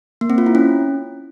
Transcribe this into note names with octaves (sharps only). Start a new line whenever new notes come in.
A#3
C4
F4
E4
C#4